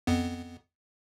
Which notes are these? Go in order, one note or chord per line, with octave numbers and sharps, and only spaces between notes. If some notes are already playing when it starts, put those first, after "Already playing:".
F2 B3